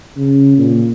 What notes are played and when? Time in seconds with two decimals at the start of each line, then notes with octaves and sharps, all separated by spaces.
0.17 C#3
0.58 A#2